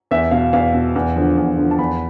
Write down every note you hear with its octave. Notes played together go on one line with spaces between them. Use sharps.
E2 E5
B2 F5
E2 F5
B2
E2
D3 F3
E2
D3 F3
A5
E2 B5